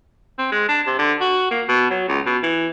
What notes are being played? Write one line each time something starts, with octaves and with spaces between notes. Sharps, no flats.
C4
G#3
D4
C3
D3
F#4
A#3
B2
F#3
C#2
B2
E3